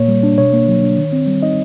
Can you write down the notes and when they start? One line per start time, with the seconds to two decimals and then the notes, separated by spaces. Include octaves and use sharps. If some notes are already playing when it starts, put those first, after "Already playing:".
Already playing: A#2 A#3 C#5
0.08 G3
0.23 D4
0.38 B2 C#5
0.53 A#3
0.68 F#3
0.83 D4
0.97 D#3
1.13 C4
1.27 G3
1.43 D#4 D#5